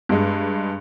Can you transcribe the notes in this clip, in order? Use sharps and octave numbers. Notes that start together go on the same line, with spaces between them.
G2 G#3